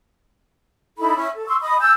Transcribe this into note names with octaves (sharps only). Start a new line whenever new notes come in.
D#4 E4 A4 B5
C#4 E4 C#5
A4
C6 C#6 E6
D#5 B5 D#6
G#5 A5 E6 G6